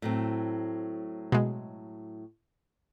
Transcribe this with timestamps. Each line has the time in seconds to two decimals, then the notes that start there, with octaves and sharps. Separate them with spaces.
0.02 A2 F#3 C4
1.32 B2 G#3